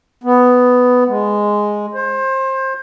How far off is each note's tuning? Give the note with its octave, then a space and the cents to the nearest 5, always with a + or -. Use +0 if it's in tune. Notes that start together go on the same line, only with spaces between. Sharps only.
B3 +10
G#3 +0
C5 +25